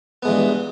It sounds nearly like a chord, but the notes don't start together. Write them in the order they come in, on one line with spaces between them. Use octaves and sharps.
B3 G#3 E3 G2